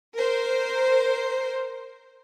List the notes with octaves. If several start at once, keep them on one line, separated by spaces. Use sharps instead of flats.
A#4 C5